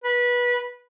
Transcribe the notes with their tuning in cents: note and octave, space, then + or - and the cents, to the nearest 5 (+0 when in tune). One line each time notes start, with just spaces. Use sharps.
B4 -20